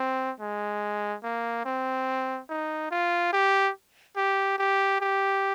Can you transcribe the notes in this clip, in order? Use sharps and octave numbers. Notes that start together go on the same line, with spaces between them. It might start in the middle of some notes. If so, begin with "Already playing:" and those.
Already playing: C4
G#3
A#3
C4
D#4
F4
G4
G4
G4
G4